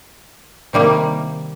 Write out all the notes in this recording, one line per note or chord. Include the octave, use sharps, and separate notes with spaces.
C3 D#3 G3 A#3